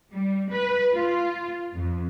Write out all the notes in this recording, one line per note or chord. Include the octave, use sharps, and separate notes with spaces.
G3
B4
F4
F2